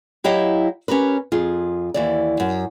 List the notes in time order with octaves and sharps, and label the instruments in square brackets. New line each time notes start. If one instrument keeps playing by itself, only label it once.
[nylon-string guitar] F#3 E4 G4 D#5 F5 G5
C#4 G4 A#4 B4
F2 F4 G#4
D#2 E3 D5
F#2